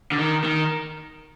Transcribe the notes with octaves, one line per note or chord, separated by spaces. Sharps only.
D3
D#3
D#3